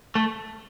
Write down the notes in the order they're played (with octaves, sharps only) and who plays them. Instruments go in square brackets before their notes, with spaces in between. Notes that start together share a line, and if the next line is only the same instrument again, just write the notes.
[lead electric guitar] A3